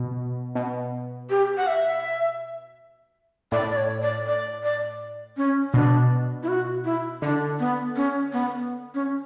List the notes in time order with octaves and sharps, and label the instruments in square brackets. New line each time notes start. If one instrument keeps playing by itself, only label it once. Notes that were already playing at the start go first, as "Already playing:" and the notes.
Already playing: [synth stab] B2
B2
[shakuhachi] G4
F#5
E5
[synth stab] A2 [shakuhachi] D5
[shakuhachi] D5
C#5
D5
D5
D5
C#4
[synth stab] B2 [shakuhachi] D4
[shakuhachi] E4
F#4
E4
[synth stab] D3 [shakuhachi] D4
[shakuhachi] B3
C#4
B3
C#4